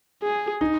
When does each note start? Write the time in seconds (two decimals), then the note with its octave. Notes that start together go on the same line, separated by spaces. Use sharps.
0.23 G#4
0.61 D#4